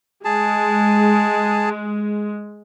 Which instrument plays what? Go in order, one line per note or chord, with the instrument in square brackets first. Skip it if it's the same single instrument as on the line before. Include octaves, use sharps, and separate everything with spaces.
[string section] G#3 [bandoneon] G#4 A5